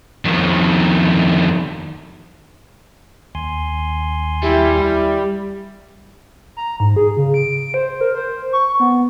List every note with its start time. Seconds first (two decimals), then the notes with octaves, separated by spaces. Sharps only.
0.25 F2 D#3
3.35 D#2 G#5 C6
4.43 G3 E4
4.81 E4
6.57 A#5
6.80 G#2
6.96 G#4
7.17 C#3
7.34 D7
7.74 C5
8.01 A#4
8.15 C5
8.53 C#6
8.80 B3